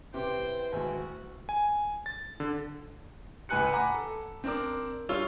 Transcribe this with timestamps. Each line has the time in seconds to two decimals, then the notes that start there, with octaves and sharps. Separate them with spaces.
0.14 C3 E3 C5 G5
0.72 G#1 D2 F#4 G#5
1.49 G#5
2.06 A6
2.40 D3
3.49 C#2 A2 B4 G#5 F#6 C#7
3.73 F#5 G#5 A#5 B5 D6
3.94 A4
4.44 C4 D4 A#4 D6
5.09 G3 D4 F4 C#5 E6 G7